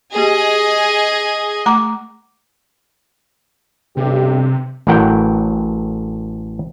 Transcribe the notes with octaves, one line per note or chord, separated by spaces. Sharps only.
A#3 G4 G#4 D#5 G#5
A3 A#5 D6
B1 G2 C3 G4
A1 A2 F#3 A#4 F#5 G5